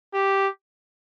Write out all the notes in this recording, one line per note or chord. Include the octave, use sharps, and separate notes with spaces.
G4